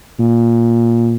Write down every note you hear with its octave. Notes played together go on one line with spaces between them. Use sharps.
A#2